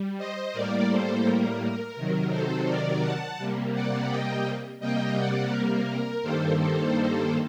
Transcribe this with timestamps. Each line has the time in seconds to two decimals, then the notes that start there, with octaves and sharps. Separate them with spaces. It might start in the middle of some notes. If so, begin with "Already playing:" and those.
Already playing: G3
0.17 C5 D#5
0.53 A2 G3 A#3 A#4 D5
0.89 A4 C5
1.24 A#4
1.60 A#4
1.96 C3 D#3 F#3
2.31 A4 C5
2.66 A#4 D5
3.02 F#5 A5
3.38 C3 G3 A#3
3.73 D5 F#5
4.09 D#5 G5
4.80 C3 G3 A#3 D#5 G5
5.16 D5 F#5
5.52 A#4
6.23 G2 D#3 G3 A#3 A4 C5
6.58 A4 C5